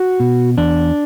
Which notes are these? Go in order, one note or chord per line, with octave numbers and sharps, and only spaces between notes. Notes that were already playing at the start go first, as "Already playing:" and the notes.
Already playing: F#4
B2
E2 D4